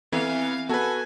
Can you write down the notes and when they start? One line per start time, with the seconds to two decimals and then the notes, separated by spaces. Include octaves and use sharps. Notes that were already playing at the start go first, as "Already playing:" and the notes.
0.12 E3 B3 C4 E5 F5 G#5
0.69 B3 F#4 A4 B4 G#5